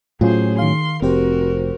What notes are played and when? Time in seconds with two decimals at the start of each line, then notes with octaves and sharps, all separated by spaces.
0.21 A2 F#3 C#4 F4 G#4 C5
0.59 D#3 F5 C6
1.02 F1 C4 F#4 G4 A#4 C5